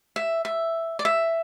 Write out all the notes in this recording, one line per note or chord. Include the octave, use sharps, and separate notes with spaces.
E5
E5
D5
E5